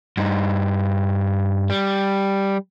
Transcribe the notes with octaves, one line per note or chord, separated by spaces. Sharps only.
G2 D#4
G3